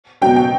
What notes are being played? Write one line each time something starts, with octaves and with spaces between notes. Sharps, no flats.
B2 F#3 G5
G5